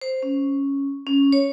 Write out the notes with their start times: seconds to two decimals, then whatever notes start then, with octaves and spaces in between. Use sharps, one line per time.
0.02 C5
0.23 C#4
1.07 C#4
1.32 C#5